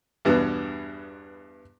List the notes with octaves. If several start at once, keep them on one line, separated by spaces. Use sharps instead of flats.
E2 G2 B2